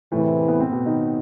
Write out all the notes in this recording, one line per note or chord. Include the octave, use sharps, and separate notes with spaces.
E2 A2 C3 E3 A3
B3
C4
B2 B3
D#3 D#4